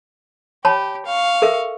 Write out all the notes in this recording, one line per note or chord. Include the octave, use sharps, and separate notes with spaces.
G4 C#5 A5 B5
F5 C#6
A4 A#4 E5